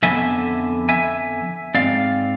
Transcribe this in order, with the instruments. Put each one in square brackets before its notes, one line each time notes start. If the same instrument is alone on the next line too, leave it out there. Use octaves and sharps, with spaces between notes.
[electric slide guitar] F2 D3 F3 B3 E5 G#5
E5 G#5
G#2 G#3 C4 D5 F5